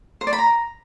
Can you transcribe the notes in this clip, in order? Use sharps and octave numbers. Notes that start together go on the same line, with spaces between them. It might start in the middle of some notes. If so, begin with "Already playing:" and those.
C5
D5
B5
A#5